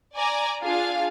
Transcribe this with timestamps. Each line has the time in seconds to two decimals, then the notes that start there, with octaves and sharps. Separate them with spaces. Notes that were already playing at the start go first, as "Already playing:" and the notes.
0.15 D5 G#5 A#5
0.63 D4 F4 G#4 F5